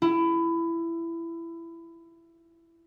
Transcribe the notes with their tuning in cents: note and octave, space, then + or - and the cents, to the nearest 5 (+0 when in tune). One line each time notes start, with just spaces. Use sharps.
E4 +20